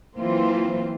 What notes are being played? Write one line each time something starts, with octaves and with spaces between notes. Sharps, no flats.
E3 F#3 A#3 C4 F4 C5